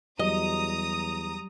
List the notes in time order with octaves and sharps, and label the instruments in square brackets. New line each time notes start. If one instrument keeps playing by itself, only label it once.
[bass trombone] E2 [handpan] F#3 G3 [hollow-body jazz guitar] D#5 [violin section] A#5 D#6